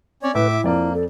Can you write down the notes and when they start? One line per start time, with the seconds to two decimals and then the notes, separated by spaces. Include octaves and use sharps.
0.23 C4 C#4 C#5 D5
0.35 A2 B4 E5 D6
0.50 E4
0.64 F2 A#3 D5
0.94 A4